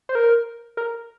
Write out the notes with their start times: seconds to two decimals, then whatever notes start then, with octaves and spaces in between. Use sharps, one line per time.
0.09 C5
0.15 A#4
0.77 A#4